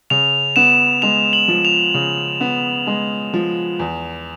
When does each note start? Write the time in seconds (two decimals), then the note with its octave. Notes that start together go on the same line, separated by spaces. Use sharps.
0.10 C#3 F7
0.56 B3 E7
1.02 G#3 F7
1.33 F#7
1.48 F3
1.65 F7
1.94 C#3
2.41 B3
2.87 G#3
3.34 F3
3.79 E2